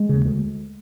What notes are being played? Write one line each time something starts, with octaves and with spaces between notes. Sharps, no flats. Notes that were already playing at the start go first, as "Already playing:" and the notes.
Already playing: G#3
D#2 C#3
D2